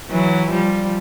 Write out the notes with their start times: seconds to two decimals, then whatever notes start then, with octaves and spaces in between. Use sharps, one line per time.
0.09 E3 F#3
0.50 F3 G3